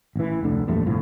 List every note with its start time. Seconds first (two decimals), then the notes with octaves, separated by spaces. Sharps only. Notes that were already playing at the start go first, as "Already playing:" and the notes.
0.16 A1 E3
0.43 F1 D2 D3
0.68 A#1 E2 G2 A3
0.86 G1 C2 A2 F3